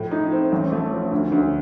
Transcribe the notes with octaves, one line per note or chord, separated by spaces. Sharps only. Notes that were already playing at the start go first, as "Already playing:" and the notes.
Already playing: A2 F3
D#4
C4
A1
A3
F3
D2
D2